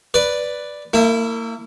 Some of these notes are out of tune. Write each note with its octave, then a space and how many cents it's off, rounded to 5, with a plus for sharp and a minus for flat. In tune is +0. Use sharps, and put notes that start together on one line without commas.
B4 +0 D5 +0
A#3 -35 E4 +0